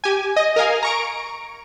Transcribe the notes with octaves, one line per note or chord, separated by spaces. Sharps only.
G4 G#5
D#5
A#4 D#5 F5 G#5
A#5 C#6 D7